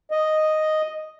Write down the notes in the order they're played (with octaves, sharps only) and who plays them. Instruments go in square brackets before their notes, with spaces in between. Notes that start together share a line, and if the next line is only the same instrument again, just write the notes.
[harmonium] D#5